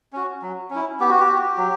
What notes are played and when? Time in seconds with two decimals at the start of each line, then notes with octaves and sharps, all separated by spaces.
0.13 C#4 F#4
0.42 F#3
0.70 C#4 E4
1.00 B3 G4
1.10 F#4
1.20 G4
1.29 F#4
1.58 F#3